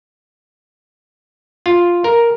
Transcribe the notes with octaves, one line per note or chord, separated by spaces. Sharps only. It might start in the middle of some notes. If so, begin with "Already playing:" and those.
F4
A#4